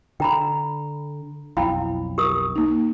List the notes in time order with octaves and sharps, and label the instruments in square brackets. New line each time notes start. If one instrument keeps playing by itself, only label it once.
[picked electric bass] D3 [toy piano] G5 A#5 B5
[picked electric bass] B1 F2 [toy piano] E4 G5 B5 [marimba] F5
[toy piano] G4 A#4 D#6
[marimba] A#3 D#4